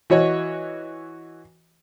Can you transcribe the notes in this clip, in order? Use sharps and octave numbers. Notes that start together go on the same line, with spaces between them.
E3 F#4 C#5 D#5